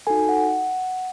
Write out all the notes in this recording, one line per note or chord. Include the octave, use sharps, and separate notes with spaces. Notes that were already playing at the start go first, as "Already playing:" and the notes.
D#4 F#4 A4 G#5
F#5